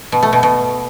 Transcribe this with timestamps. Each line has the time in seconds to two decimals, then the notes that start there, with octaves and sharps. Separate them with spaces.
0.12 B2
0.23 A3
0.33 B2
0.43 B2